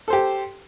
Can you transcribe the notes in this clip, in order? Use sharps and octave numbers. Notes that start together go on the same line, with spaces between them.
G4 A4 C5